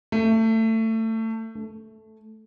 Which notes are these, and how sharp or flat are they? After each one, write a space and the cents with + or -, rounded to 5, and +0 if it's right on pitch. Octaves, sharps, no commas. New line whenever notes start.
A3 +25
A3 -5